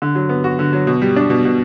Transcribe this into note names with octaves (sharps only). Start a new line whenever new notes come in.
D3
F#3
B3
F#4
D3
F#3
B2
G3
D4
B2
B2